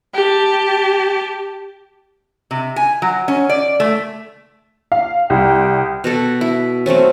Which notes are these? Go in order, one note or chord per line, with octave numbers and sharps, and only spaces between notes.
G4 A5
C3
G#5
F#3
C#4
D5
A3
F5
C2 G5
B2 F#4 A4
E4
F#3 A3 C4 C#4